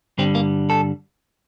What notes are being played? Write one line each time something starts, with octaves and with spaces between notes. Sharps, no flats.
G2 D3 G3 C4
A#3
A4